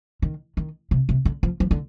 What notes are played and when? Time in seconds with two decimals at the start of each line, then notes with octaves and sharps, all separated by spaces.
0.22 D#3
0.57 D#3
0.91 C3
1.09 C3
1.25 D3
1.43 F3
1.60 F3
1.71 D3